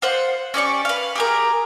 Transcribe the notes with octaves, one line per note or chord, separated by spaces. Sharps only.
F4 C5 F#5
C#4 G4 D5 C#6
B4 F5
G4 G#4 A#4